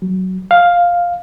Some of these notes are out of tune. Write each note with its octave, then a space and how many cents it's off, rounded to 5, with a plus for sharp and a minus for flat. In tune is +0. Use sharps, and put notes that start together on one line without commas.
F#3 +10
F5 +5